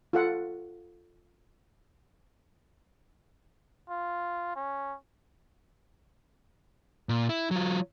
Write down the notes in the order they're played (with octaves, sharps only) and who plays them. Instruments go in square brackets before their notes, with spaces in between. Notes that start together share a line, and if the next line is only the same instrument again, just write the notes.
[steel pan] F4 A4 F#5
[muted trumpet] F4
C#4
[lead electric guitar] A#2
E4
F#3 F4